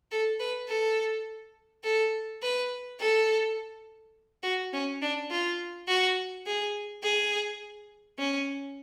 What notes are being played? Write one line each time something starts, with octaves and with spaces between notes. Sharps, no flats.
A4
B4
A4
A4
B4
A4
F#4
C#4
D4
F4
F#4
G#4
G#4
C#4